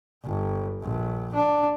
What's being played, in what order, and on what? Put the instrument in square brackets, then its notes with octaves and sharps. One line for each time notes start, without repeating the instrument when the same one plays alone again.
[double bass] G1
A#1
D4